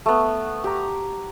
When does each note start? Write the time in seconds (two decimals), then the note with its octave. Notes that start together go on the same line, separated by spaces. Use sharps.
0.06 A3 B3
0.64 G4 A#5